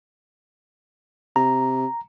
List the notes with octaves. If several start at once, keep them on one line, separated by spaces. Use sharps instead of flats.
C3 A#5